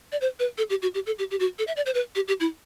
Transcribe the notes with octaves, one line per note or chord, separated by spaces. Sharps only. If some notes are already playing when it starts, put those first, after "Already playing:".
D5
C5
B4
A4
G4
F#4
G4
A4
G4
G4
F#4
A4
E5
D5
C5
B4
G4
G4
E4